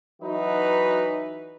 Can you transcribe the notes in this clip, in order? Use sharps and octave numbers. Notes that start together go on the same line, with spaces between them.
E3 F#3 D#4 F#4 B4